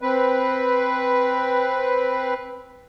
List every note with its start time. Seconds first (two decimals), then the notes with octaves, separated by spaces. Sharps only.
0.01 C4 B4